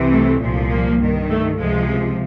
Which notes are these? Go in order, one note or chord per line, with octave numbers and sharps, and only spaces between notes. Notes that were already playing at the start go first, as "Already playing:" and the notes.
Already playing: C2 C3 E3
A3
C2 A#2 F3
A#3
G2 D#3
A3
C#2 C3 F3 G#3